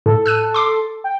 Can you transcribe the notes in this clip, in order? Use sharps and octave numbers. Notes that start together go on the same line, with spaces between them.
A2 A4
E6 F#6 D#7
C6 D6 C7
G5